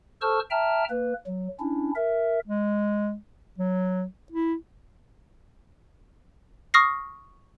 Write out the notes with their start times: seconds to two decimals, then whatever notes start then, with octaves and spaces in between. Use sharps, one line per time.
0.21 A4 C5 A5 C#6 E6 F6
0.51 E5 G5 A5 A#5 F6
0.90 A#3 B4
1.27 F#3
1.60 C#4 D4 E4
1.96 A#4 E5
2.45 G#3
3.58 F#3
4.32 E4
6.74 C#6 D#6 F6 A#6 C7